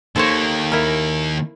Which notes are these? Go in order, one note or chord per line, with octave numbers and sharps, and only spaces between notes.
D#3 A#3 A4 C5 C#5
E4 A#4